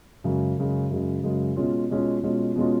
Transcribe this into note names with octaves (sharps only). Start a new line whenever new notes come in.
F#2 C#3 G#3
F#2 C#3 G#3
F#2 C#3 G#3
F#2 C#3 G#3
B2 G#3 C#4 F4
B2 G#3 C#4 F4
B2 G#3 C#4 F4
B2 G#3 C#4 F4